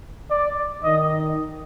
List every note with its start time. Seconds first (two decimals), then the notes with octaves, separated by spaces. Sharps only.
0.30 D5
0.84 D#3 D#5